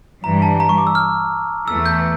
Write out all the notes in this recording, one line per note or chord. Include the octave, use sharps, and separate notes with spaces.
G2 E3 G3 A#5
A5
A#5
C#6
D6
E6
F6
E2 E3 A3 E6
G6